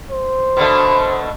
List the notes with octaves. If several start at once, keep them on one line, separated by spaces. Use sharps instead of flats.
C5
B2 D3 A3